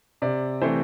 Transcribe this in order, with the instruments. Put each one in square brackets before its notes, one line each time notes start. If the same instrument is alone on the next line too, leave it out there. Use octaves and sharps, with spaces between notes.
[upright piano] C3 D5
E3 A3 C4 C5